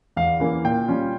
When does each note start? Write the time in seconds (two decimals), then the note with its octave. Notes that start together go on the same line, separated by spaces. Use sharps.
0.16 E2 F5
0.40 E3 A#3 C#4
0.65 A#2 G5
0.88 G3 C#4 F4